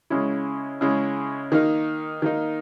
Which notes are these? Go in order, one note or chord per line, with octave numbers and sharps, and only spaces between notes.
C#3 G#3 C#4 E4
C#3 G#3 C#4 E4
D#3 A#3 D#4
D#3 A#3 D#4